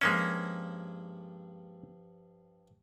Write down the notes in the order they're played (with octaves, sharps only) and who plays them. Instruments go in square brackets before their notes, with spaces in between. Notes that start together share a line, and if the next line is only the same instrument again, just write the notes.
[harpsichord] G2 F3 E5 [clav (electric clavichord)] G#3 A#3 C#4